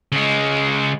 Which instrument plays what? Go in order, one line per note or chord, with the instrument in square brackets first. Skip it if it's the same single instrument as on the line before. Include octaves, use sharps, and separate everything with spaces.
[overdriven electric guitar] C#3 G#3